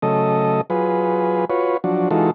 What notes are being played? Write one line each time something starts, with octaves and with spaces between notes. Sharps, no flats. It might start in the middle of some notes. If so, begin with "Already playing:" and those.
C#3 F#3 A3 A4 D#5
F#3 F4 G#4 B4
F4 F#4 B4 C#5
F3 F#3 D4 F#4
E3 G#3 D#4 F4 F#4 A4